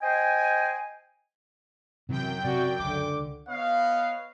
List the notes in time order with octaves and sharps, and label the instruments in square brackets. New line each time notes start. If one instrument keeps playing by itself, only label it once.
[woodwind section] C5 D#5 G5 G#5
[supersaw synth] F#2 G5 [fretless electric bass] C3 E3
[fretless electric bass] C3 [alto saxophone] F#4 [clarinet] D5
[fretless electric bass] C#2 [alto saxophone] D3 [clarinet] D6
[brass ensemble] B3 B4 C#5 D#5 F5